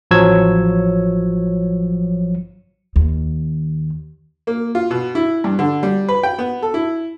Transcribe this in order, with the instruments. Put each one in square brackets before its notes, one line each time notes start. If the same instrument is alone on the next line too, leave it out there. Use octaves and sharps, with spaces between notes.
[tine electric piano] A1 F3 F#3 C#5 E6 G#6
[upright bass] D#2
[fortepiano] A#3
F4
B2
E4
G2
D3
G3
B4
G5
B3
A4
E4